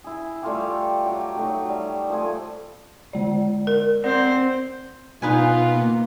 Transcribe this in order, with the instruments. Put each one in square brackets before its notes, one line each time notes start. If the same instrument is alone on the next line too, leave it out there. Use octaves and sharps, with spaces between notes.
[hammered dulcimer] E4 G#4
G3 A3 F4 G4
F#3 G4
F#3 A3 D#4
G3
F3 A3 G#5
[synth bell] D3 G#3 D5
[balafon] A#4
[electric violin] C4 C5 [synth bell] D5 F#5 A#6
[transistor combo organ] B2 [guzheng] D#4 B4 G#5 [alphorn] F4
[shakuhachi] A#3